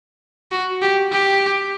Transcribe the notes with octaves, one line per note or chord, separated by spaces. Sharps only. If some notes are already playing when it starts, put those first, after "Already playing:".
F#4
G4
G4